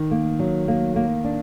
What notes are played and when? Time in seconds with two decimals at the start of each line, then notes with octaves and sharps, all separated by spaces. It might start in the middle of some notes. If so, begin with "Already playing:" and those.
Already playing: D#3
0.11 A#3
0.39 F#3
0.68 A#3
0.96 A#3
1.24 D4